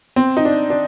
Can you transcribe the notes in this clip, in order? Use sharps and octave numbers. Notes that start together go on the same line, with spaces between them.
C4
D#4
D4
D4